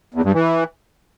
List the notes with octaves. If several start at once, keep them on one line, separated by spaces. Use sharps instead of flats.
E2
G2
E3